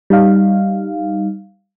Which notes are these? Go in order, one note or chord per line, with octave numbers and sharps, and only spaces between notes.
G3 D#4 F5